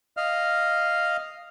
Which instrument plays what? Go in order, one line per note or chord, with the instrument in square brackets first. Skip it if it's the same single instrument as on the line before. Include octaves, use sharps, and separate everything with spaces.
[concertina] D#5 F5 F6